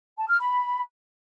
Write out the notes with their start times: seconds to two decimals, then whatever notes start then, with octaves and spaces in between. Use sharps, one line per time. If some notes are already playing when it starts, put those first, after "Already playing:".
0.18 A5
0.29 F6
0.40 B5